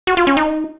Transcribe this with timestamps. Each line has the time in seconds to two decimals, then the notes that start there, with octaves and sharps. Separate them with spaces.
0.07 F#4
0.17 F4
0.27 C#4
0.37 D#4